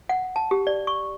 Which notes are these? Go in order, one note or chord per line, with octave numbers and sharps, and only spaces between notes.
F#5
A5
G4
D5
C#6